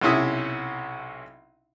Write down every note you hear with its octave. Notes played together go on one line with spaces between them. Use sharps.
B1 C3 C#4 E4 E5 D#6